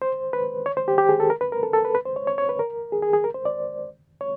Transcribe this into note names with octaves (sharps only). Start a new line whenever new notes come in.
C5
B4
C#5
C5
G4
G4
G#4
A4
A#4
B4
A#4
A4
A4
B4
B4
C5
C#5
C#5
C#5
B4
A#4
G#4
G#4
G#4
A#4
C5
D5
C#5